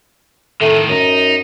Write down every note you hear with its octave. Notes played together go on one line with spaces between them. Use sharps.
A2 D#3 A3
F#2 D#4